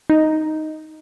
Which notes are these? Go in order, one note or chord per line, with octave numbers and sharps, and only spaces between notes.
D#4